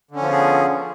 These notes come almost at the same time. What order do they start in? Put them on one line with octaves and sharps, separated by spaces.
D3 C#4 F3 B3 G#4